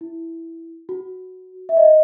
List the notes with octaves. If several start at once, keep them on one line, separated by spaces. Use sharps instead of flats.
E4
F#4
E5
D#5